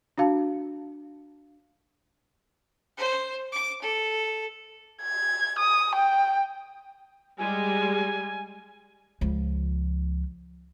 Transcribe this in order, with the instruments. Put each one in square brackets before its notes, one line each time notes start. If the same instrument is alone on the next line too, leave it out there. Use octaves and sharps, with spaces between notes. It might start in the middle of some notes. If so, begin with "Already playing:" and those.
[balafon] D4 F#4 F5 A5
[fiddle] C5
D6
A4
[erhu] G#6
D#6
G5
[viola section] G3 G#3 [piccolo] G#5
[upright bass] C#2 F3